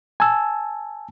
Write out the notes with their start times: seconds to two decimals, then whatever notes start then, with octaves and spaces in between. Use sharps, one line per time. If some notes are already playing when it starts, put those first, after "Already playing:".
0.20 G#5 A5 E6